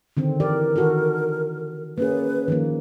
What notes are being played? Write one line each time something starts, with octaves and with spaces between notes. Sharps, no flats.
D3 D#3 C4
E3 G4 A#4 D5
D#3 F#4 A4
A#3 C#4 G#4 B4
D#3 F3 A#3